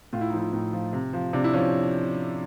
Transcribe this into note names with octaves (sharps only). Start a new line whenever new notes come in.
A2 F4
E4
F3 D#4
E4
A2 D#4
F3
C3
F3
C3 D4
E4
F3 C#4